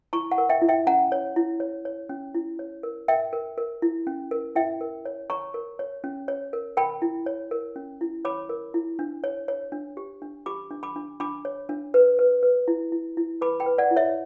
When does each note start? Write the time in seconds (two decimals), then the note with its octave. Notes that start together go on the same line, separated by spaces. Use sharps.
0.13 E4 A#5 C#6
0.31 F#5 A#5
0.38 A#4
0.49 E5 G5
0.62 E4
0.68 E5 G5
0.87 C#4 F#5 A#5
1.12 C#5
1.36 E4
1.60 C#5
1.85 C#5
2.09 C#4
2.34 E4
2.59 C#5
2.83 A#4
3.08 A#4 E5 G5
3.33 A#4
3.58 A#4
3.82 E4
4.07 C#4
4.31 A#4
4.55 E4 E5 G5
4.81 A#4
5.05 C#5
5.30 C#5 A#5 C#6
5.54 A#4
5.79 C#5
6.04 C#4
6.28 C#5
6.53 A#4
6.77 A#4 G5 B5
7.02 E4
7.26 C#5
7.51 A#4
7.76 C#4
8.01 E4
8.25 C#5 B5 D6
8.49 A#4
8.74 E4
8.99 D4
9.24 C#5
9.48 C#5
9.72 D4
9.97 G4
10.22 D4
10.46 G4 B5 D6
10.71 D4
10.83 B5 D6
10.96 D4
11.20 D4 B5 D6
11.45 C#5
11.69 D4
11.94 B4
12.19 B4
12.43 B4
12.68 E4
12.92 E4
13.17 E4
13.41 B4 B5 D6
13.60 G5 B5
13.66 B4
13.78 D5 F#5
13.91 E4
13.96 C#5 E5